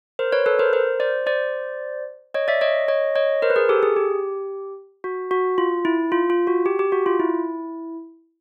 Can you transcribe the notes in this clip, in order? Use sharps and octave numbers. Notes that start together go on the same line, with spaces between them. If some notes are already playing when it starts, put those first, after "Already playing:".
A#4 C5
B4 C#5
A4 B4
A#4 C5
A#4 C5
C5 D5
C5 D5
C#5 D#5
D5 E5
C#5 D#5
C#5 D#5
C#5 D#5
A#4 C5
B4
G#4 A#4
G4 A4
G#4
G4
F#4
F#4
F4
E4
F4
F4
F#4
G4
G4
F#4
F4
E4